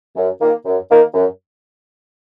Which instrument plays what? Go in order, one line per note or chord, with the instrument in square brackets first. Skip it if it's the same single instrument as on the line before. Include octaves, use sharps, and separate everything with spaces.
[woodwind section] F#2
D#3 A#3
F#2
D#3 A#3
F#2